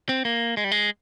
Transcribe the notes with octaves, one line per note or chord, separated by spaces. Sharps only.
C4
A#3
G#3
G3
G#3